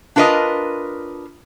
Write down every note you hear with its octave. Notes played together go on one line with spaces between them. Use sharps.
D4 F4 A#4 B4 D#5